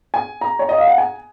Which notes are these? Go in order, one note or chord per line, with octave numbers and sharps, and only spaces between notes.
G#5
A#5
C#5
D#5
F5
F#5
G#5